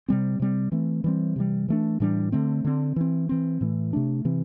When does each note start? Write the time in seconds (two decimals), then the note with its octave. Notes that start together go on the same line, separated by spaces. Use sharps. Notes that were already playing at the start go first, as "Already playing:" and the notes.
0.08 C3 G3 C4
0.40 C3 G3 C4
0.72 E3 A3 C4
1.04 E3 G3 C4
1.36 C3 E3 G3
1.68 E3 A3 D4
2.00 A2 E3 G3 D4
2.32 D3 A3 C4
2.64 D3 C4
2.96 E3 C4
3.29 E3 C4
3.61 A2 E3 A3
3.93 C3 A3 D4
4.25 C3 E3 C4